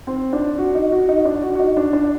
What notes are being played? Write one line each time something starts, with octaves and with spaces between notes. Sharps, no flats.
C4
D4
F#4
D#4
F#4
D#4
D4
F#4
F#4
D#4
D4
D4